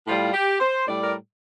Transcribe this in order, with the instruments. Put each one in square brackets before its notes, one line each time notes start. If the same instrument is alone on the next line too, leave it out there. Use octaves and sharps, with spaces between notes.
[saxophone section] A2 G3 F4
G4
C5
A2 G3 D5
A#4